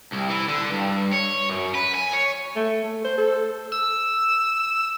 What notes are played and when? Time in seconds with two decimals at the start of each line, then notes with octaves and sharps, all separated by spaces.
0.12 C2
0.29 E3
0.48 D3
0.70 G2
1.12 C#5
1.49 F#2
1.75 B4
1.95 G#5
2.13 C#5
2.56 A3
2.84 A3
3.05 C5
3.18 A4
3.72 E6